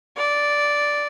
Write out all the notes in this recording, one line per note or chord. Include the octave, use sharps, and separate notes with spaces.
D5